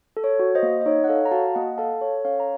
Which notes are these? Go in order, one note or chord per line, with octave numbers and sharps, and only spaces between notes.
A4
C#5
F#4
C5 D#5
A#3
D#5
D#4 C#5
F#5
A4 C#5 F5
A#5
F#4 F5 A5
A#3 D#5 F#5
A4 F5 A5
A4 C#5
C#4 C#5 F5
A#5